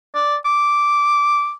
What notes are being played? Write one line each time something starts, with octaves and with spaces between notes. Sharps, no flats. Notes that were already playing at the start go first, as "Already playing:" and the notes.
D5
D6